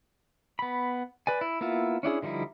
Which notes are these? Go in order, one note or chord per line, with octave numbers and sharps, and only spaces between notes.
B3 B5
B4 D5 G#5
E4
A#3 B3 E4 F4 E5
C#4 D4 E4 G#4
D3 F3 G3 D#4 E4